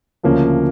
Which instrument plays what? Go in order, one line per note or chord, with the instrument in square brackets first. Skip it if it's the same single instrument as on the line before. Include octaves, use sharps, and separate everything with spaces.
[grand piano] D2 C#3 F3 A#3 C#4